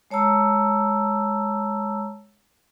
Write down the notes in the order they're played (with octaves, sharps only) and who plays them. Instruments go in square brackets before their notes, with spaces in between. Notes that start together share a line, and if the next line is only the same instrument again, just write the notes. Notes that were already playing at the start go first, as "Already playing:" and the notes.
[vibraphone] G#3 C#5 A5 A#5 E6